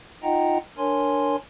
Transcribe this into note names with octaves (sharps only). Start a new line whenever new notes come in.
D#4 F4 D#5 F#5 G5 A#5
D4 A#4 C#5 G#5 C6